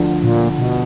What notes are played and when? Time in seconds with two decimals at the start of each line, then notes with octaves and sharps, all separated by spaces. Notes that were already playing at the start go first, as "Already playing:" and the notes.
Already playing: D2 D3 F3
0.24 A#2
0.59 B2